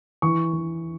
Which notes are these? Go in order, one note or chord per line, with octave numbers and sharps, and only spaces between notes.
E3 C#6
E3